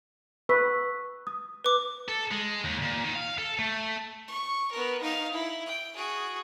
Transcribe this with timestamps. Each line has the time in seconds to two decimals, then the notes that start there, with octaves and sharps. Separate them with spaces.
0.49 B4 C#6 E6 B6
1.27 D#6
1.64 B4 D6
2.09 A4
2.31 G#3
2.64 D#2
2.82 A#2
3.03 D#3
3.15 F5
3.38 A4
3.59 A3
4.28 C#6
4.72 B3 A#4
5.02 D#4 F5
5.33 E4
5.66 G5
5.95 F#4 G#4